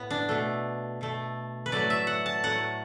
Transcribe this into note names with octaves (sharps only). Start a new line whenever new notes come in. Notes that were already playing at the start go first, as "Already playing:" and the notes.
Already playing: A2 B3
D4
B2 A3
B2 A3
B4
A2 F#3 A3 D5
E5
F#5
A5
A2 F#3 A3 F#5